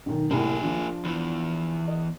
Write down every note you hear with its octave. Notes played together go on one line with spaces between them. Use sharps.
B1 D#3
C2 A2 A#3 G#4
F3 D4
E2 E3
D#5